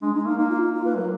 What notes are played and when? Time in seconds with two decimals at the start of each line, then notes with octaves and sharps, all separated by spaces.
0.02 G#3 D4
0.14 G#3 D#4
0.26 A#3 D#4
0.38 A#3 D#4
0.50 F4
0.61 D#4
0.74 F4
0.85 A#3 B4
0.97 F#3 A#4